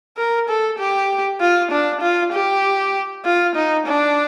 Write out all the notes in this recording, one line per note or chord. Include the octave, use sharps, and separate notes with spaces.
A#4
A4
G4
F4
D4
F4
G4
F4
D#4
D4